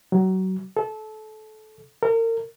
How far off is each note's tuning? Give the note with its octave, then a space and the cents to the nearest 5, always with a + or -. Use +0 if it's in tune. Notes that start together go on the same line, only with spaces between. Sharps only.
F#3 +25
A4 -25
A#4 -35